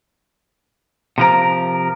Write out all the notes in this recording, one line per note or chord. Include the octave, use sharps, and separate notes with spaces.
C3 F3 A#4